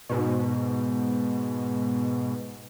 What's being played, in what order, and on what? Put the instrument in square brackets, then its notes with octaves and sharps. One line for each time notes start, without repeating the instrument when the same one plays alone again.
[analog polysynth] G#2 B2